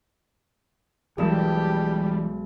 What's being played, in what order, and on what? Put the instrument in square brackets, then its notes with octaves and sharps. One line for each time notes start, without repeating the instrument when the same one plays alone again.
[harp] B1 G#3 A5 [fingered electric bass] E3 [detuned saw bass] G3 [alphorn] G4